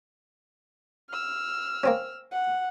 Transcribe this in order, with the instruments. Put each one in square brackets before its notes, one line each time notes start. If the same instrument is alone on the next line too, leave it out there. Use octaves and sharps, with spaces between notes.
[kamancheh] E6 F6
[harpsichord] A#3 C4 C#4
[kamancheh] F#5